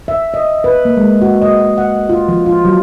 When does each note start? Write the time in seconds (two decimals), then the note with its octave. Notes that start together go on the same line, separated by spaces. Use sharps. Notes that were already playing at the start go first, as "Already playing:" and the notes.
0.08 E5
0.34 D#5
0.64 B4
0.85 A#3
0.97 G#3
1.22 F#4
1.42 D#5
1.78 F#5
2.09 F4
2.29 F3
2.46 F4
2.65 F#3